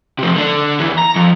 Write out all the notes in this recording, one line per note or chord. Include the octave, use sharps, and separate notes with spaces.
C3 F3
D3 D4
D#2 E3
A#5
F2